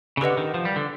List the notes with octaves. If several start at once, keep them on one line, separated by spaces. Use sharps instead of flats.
C#3
D3 G4 B4 D#5 F#5
D#3
F3
G3
D3